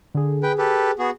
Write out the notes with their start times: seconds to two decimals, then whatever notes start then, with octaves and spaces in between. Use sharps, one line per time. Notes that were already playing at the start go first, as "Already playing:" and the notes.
0.14 D3 G#4
0.43 G#4 B4 G5
0.58 G4 A4 B4
0.99 B3 F#4 G#4